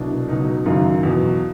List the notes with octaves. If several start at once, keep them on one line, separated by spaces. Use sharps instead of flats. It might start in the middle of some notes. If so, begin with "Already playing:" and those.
Already playing: C2 B2 F#3 D4
C#2 B2 F#3 D#4
F#1 F#2 D#3 F#3 F4
E2 B2 F#3